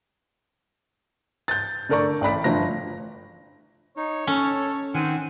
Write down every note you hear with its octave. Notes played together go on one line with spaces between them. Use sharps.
G6 A6
D3 A3 A#4 D5 C#6
A1 D5 B5 B6
G1 A2 F3 A#6
D#4 C#5
C#4 A4
D#3 C4 F#5 G#5